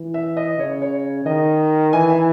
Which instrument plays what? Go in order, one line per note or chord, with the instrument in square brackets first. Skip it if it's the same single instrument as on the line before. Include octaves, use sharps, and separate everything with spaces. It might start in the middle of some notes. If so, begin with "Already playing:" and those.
Already playing: [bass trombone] E3
[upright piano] E5
D#5
[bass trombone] C#3 [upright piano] C#5
[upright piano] C#5
[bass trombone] D#3 [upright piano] D#5
[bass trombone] E3 [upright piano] G#5
[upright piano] E5